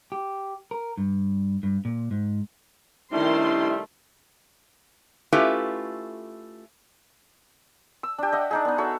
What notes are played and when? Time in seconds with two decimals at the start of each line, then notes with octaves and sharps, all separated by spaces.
0.12 G4
0.71 A#4
0.98 G2
1.63 G2
1.85 A#2
2.11 G#2
3.12 C3 D#3 G3 A3 C#4 D4 E4 C6
5.33 A3 C#4 E4 F4 G4 B4
8.03 E6
8.18 D4 G4
8.32 D#5 E5 F#5
8.51 D4 D#4 G#4
8.65 B3 D#4
8.78 F#4 A4 C#5 E5